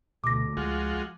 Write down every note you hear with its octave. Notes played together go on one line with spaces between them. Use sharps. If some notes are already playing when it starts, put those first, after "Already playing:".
D2 B2 D6 A#6
C#2 F3 G#3 F4 F#4